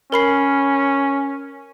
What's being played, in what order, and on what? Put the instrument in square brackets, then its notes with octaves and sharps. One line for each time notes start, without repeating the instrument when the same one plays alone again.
[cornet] C#4 [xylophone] A#4 B5 C7